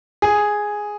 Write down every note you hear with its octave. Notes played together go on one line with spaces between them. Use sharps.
G#4